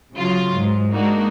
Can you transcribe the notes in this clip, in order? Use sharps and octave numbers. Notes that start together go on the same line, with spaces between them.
C#3 F#3 F4
G#2
G#3 A#3 D4 D#4 F#4